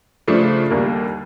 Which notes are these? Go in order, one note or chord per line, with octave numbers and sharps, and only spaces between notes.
C#3 F3 A3 D4
D#2 D3 G3 A#3 D4